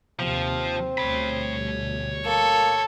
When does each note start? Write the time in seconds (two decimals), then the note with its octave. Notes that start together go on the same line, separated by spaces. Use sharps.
0.19 D#2 C3 F3 C4
0.98 D2 B2 G3 C#5 B5
2.25 A#3 A4